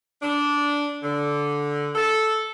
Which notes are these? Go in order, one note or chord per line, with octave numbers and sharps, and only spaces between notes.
D4
D3
A4